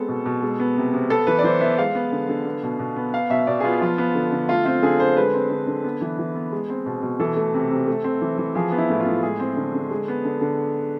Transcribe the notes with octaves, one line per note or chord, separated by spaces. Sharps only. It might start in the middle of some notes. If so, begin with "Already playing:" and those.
Already playing: G#3 B3 C4 A4
B2
B2
G#3
B3
C3
C3
B3 A4
E3 B4
D5
E3 C5
B3 E5
G#3 F5
B3
D3
D3
B3
B2
B2
B3
B3 F5
B2 E5
B2 D5
G#4
B3 F4
F3 F4
B3
D3
D3
A3 F4
C4 F4
D3 G#4
D3 C5
G#3 B4
C4
D3
D3
B3
E3
E3
B3
G#3
C4
B2
B2
E3 A4
A3
C3
C3
A3
C4
E3
E3
F3 G#4
B3
E4
A2
F4
A2
G#3 G#4
C4
D3
D3
G#3
B3
D3
D3